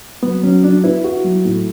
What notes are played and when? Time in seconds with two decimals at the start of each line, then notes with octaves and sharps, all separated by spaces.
0.23 F#3 B3
0.43 F#3 C#4
0.63 F#3 D4
0.84 B3 E4
1.04 F#4
1.24 F#3
1.45 A2